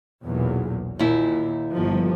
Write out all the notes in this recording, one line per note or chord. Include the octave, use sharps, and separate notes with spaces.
B1 E2 A#2
D#2 A#2 E4
G1 F3